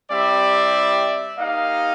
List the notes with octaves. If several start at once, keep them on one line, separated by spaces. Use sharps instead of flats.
G3 C4 E4 G4 D5 E5
A#3 D#4 G4 D#5 F5